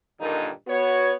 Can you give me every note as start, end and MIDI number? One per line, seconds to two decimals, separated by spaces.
0.20 0.49 43
0.20 0.49 46
0.20 0.49 50
0.20 0.49 51
0.20 0.49 58
0.20 0.49 63
0.67 1.13 59
0.67 1.13 66
0.67 1.13 73